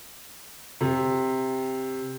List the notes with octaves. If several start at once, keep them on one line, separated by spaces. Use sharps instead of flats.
C3